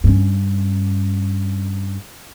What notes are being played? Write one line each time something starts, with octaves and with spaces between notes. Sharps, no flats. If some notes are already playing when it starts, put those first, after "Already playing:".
G2 C#4